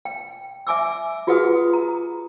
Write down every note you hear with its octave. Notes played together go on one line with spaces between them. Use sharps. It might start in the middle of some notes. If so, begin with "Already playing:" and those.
G5
E5 G#5 D6 E6
F4 F#4 G#4 B4 F#5 D#6
A#5